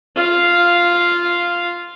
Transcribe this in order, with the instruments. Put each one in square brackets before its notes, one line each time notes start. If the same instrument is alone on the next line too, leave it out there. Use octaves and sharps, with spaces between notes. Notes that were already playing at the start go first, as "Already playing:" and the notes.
[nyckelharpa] F4 F5